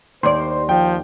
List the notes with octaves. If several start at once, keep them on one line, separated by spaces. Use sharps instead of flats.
D#2 C5 D5 C6
F3 G5